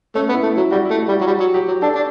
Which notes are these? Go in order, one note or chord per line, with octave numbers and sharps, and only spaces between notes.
A3 C#4
B3
E4
A3
E4
F#3
G3 F#4
E4
A3
E4
G3
F#4
F#3
G3 F#4
F#3
F#3 G4
F#3
D4 A4
D4